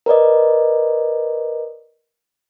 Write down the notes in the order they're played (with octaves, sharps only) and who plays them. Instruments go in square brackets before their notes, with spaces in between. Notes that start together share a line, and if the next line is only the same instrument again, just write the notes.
[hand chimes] A#4 B4 D5 D#5